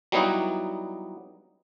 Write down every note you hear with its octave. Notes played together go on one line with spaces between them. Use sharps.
F#3 G3 B3 D#4 E4 F#4